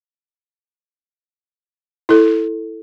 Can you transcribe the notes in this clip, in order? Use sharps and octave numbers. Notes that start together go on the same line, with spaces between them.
E4 A4